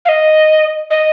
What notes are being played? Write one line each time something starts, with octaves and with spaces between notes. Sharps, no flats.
F5
D#5
D#5